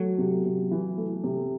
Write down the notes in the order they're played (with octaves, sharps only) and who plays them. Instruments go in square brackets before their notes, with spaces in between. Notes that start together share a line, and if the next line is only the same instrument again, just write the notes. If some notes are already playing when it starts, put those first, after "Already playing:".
Already playing: [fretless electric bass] F#3 [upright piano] A3
[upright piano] C3
C3
E3
A3
C3